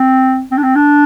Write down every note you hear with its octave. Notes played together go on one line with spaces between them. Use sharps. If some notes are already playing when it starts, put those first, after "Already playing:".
Already playing: C4
C4
D4
C4
D4